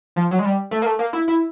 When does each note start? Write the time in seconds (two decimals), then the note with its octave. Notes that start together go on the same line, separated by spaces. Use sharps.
0.16 F3
0.31 F#3
0.39 G#3
0.45 G3
0.71 A3
0.82 A#3
0.86 A3
0.99 A#3
1.13 E4
1.28 E4